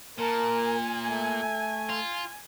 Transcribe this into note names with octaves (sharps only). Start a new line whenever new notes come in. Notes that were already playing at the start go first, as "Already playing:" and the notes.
A#2 A#4 A5
G#5
A3
F4